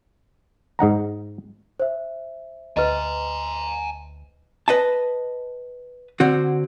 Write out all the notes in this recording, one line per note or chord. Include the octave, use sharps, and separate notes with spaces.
G#2 D#4 F#5 A#5
C5 E5
D2 B4 D#5 G#5 A#5
B4 D#5 A5
D3 C4 F#4